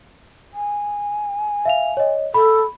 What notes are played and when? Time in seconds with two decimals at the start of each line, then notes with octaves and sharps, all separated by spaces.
0.54 G#5
1.65 E5 F5 F7
1.97 C#5 D#5
2.34 A4 B5